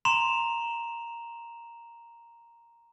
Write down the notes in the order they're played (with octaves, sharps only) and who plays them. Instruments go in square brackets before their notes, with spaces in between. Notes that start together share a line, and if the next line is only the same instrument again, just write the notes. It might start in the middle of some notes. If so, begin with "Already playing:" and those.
[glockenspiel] A#5 C6 E7 F7